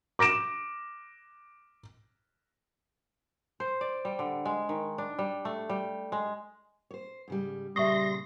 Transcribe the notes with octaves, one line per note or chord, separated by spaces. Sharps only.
D6 A#6 D7 E7
C5
D5
G3
D3
G#3
D#3
D4
G3
A3
G3
G#3
C5 C#5
G#2 C#3 G3
A#2 C#3 G3 E5 C6 C#6 D#6 A#6